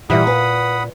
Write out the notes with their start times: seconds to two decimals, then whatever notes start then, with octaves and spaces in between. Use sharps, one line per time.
0.10 A#2 E3 G3 E5 F#5 B5 D#6
0.27 B4